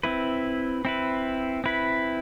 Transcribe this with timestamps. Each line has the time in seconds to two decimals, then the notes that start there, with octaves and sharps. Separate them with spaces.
0.03 C4 E4 B4
0.85 C4 E4 B4
1.64 C4 E4 B4